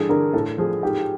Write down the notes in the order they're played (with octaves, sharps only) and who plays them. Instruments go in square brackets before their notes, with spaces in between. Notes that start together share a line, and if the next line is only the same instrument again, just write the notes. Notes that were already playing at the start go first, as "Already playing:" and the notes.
Already playing: [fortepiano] G2 E3 [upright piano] G#4 A4
[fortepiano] D3 [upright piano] A#4
[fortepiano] A2 [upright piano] A4
[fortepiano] F3 [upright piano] G#4
[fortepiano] G#2 [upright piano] G4